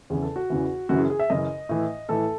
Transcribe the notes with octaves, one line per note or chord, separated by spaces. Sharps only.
E2 C#3 E3 G#4
A4
F#4
E2 C#3 E3
F#2 C#3 E3 F#4
G#4
G#4
E5
F#2 C#3 E3 D#5
A2 E3
A2 E3 A4